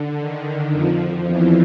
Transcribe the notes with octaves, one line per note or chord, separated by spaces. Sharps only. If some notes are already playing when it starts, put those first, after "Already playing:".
Already playing: D3
D#3
F2 F3
E2 E3